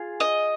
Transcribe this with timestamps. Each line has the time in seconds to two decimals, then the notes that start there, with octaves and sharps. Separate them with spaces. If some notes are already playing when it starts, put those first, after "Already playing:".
Already playing: F4 G#4
0.20 D#5